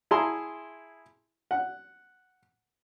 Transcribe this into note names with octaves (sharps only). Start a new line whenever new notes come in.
E4 G#4 A5 A#5 C6
F#5